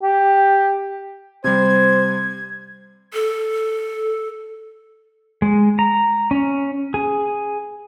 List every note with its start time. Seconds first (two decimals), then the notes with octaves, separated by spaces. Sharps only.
0.03 G4
1.44 C3 G3 C5 G#6
3.14 A4
5.42 G#3
5.79 A#5
6.31 C#4
6.94 G#4